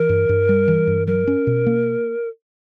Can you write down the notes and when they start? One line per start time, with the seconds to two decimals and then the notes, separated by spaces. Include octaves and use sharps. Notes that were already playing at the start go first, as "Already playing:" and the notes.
Already playing: E3 A#4
0.09 G2
0.29 G2
0.49 G3
0.68 E3
0.87 G2
1.07 F#3 A#4
1.27 C#4
1.47 B2
1.66 A#3